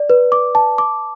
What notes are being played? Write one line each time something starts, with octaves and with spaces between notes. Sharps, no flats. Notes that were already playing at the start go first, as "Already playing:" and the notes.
Already playing: D5
B4
D6
A5
D6